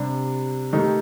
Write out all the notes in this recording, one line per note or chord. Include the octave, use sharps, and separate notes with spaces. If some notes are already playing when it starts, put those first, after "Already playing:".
Already playing: C3 G3 D4
D#3 A3 D#4 G4